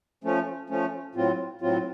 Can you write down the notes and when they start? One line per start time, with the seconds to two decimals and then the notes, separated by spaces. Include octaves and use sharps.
0.24 F3 A3 C#4
0.70 F3 A3 C#4
1.15 A2 F#3 C4 F4
1.61 A2 F#3 C4 F4